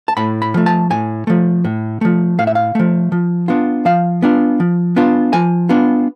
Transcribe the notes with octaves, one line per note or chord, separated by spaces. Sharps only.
A5
A2 B5
B5
F3 A3
A5
A2 G#5
F3 A3
A2
F3 A3
A2 F5
E5
F5
F3 A3
F3
B3 D4 F4
F3 F5
B3 D4 F4
F3
B3 D4 F4
F3 G#5
B3 D4 F4